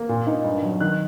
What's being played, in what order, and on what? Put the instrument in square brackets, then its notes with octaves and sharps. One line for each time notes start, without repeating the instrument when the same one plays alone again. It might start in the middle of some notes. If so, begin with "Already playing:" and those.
Already playing: [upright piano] A#3
A#2
D#4
G2
F#3
D#3 F#6